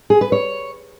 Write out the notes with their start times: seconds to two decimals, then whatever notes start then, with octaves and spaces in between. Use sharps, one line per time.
0.10 G#4
0.21 B4
0.32 C#5